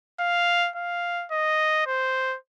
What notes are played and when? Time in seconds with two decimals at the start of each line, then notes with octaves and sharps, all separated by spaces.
0.20 F5
0.76 F5
1.31 D#5
1.86 C5